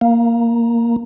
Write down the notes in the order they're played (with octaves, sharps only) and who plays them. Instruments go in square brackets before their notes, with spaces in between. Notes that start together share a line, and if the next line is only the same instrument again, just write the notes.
[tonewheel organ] A#3